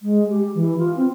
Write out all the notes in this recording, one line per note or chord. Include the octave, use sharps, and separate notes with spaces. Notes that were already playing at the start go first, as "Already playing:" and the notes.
G#3
G4
E3
F4
C4